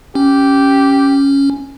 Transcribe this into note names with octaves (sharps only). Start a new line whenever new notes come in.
C#4 G4